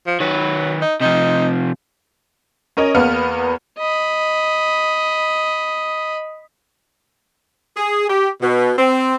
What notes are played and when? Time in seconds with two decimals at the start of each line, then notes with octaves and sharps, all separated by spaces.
0.07 F3
0.20 D#3 F#3 B4
0.82 D#4
1.01 C3 F3 D#4
2.77 C#4 A#4 C#5 D#5
2.95 E2 A#3 B3 F6
3.78 D#5 B5
7.77 G#4
8.09 G4
8.42 B2
8.77 C4